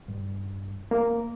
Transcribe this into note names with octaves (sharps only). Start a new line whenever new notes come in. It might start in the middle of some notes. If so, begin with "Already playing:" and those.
G2
A#3